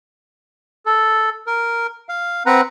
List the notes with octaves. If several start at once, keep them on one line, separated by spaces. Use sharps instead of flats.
A4
A#4
F5
C4 B4 F#5 A#5